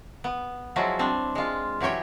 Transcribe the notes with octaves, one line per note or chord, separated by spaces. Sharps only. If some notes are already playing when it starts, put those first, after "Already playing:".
B3
F3 F#3 G#3 E4 F#4
G3 C4 D4
G#3 F4
E3 F#3 G4 C#5 G5